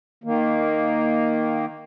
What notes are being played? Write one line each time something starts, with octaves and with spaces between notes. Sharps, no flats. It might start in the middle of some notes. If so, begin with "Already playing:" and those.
D#3 A#3